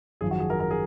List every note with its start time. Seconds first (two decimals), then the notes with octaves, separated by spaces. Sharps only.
0.21 G#1 F#2 F3 G#4
0.31 F#4
0.40 G#4
0.50 A#4
0.60 A#4
0.71 G#4